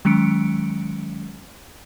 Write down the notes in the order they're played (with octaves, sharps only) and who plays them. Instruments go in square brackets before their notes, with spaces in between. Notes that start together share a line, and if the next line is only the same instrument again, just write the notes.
[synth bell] D#3 F#3 G#3 C#4 C#7 D7